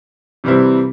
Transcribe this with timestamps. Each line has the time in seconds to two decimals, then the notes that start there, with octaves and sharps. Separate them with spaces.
0.44 C3 E3 G3 C4 E4